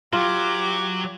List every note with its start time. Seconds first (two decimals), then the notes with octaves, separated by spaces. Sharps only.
0.13 F#3 F4 G4 D6